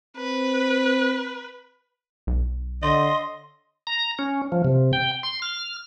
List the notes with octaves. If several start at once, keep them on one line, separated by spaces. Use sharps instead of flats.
C4 B4
B1
D3 D#5 C6
A#5
C#4
F3
C3
G5
C6
F6